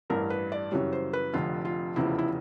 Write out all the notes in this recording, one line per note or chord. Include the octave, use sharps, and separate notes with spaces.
A1 G2 E3 A#4
B4
D5
F#2 C#3 E3 G3 C#5
C5
B4
F1 F2 D3 F4
F4
F1 E2 C#3 F3 E4
E4